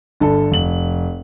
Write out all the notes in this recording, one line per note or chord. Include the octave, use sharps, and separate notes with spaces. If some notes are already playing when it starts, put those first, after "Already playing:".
G1 D3 A4
F1 F#7